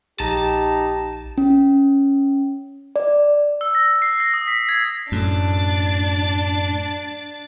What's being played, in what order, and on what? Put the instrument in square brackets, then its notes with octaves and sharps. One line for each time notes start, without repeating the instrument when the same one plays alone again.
[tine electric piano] A#1 [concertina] D#4 [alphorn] G4 [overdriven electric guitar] A5
[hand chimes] C#4
D5
[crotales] E6
A#6
C7
A#6
D#6
B6
G#6
[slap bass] F#2 A2 [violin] D4 A6